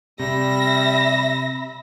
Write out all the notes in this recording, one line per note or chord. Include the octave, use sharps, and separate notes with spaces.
C3 G3 E5 B5 A#6